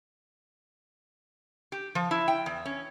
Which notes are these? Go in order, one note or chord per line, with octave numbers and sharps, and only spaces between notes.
G4
F3
E4
G5
E2
C#4